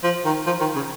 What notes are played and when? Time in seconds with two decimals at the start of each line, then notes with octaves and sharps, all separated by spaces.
0.03 F3
0.25 D#3
0.47 F3
0.61 D#3
0.76 C#3